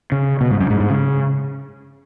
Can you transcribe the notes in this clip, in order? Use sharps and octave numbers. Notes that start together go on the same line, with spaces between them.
C#3
B2
G#2
F#2
G#2
G#2
C#3